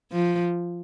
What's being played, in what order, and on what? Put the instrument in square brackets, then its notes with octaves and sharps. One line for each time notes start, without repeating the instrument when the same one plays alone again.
[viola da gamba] F3